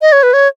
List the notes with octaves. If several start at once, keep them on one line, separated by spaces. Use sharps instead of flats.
D#5
C#5
B4
C#5